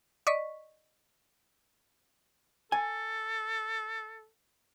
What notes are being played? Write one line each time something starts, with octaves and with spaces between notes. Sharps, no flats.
D5 D#5 C#6 B6
A4 G#5